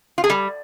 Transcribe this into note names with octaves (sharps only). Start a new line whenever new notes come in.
F4
G#4
G3